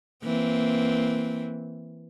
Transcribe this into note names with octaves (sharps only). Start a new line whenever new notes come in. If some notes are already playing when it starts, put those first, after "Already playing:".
E3 A#3 C4